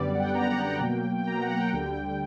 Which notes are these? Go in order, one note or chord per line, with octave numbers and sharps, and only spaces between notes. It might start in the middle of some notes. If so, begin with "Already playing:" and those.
Already playing: F#2 D3 G3 B3 D5
F#5
G5
F#2 D3 G3 B3 A#5
F#5
G5
B2 F#3 A#3
G5
B2 F#3 A#3 A#5
F#5
G5
D2 D3 G3